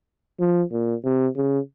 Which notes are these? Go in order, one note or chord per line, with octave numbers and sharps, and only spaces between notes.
F3
A#2
C3
C#3